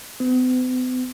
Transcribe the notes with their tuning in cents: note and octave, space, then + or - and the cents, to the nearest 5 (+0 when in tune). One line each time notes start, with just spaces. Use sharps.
B3 +45